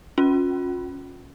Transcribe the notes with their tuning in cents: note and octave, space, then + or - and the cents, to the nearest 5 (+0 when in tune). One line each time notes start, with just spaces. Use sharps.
C#4 +0 F4 +40